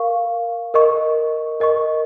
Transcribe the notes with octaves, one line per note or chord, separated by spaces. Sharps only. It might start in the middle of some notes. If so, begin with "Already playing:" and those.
Already playing: A#4 F5 C#6
A#4 D#5 C#6
A#4 D#5 C#6